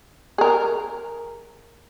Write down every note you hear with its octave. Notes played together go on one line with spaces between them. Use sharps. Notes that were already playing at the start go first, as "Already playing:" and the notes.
G#4 A#4